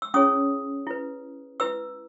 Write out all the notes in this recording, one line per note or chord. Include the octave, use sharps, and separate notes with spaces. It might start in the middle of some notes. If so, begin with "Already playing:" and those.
E6
C#4 E4 G#4 C#5 D#6
E4 B4
E4 B4 E6